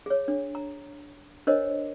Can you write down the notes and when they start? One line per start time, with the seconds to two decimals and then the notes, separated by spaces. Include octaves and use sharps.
0.06 G#4 C#5
0.28 D4
0.55 A#5
1.47 D4 A#4 C5 C#5 D#5